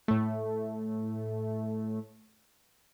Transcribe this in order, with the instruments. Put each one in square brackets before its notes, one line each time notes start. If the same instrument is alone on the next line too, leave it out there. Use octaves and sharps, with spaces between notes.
[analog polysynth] A2 A3